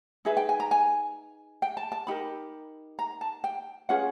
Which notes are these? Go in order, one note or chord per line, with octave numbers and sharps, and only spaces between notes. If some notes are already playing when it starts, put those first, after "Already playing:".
D#4 G#4 B4 E5
G5
G#5
A#5
G#5
G5
A5
A5
D#4 G4 A#4 B5
A#5
A5
G5
C#4 F4 G#4 B4 F#5